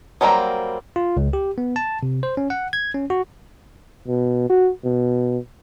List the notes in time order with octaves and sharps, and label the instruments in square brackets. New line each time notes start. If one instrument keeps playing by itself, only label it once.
[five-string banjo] F#3 G3 A#3 C4 A#5
[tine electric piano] F4
C#2
G4
B3
A5
C3
C5
C#4
F#5
G#6
C#4
F#4
[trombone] B2
F#4
B2